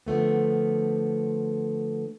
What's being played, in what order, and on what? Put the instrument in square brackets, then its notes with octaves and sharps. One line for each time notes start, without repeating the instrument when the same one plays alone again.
[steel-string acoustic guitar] D3 F3 A3 B3